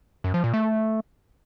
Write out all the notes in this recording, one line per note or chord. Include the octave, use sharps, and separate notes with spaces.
F#2
F3
A#2
A3